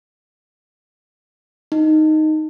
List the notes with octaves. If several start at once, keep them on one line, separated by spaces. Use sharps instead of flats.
D#4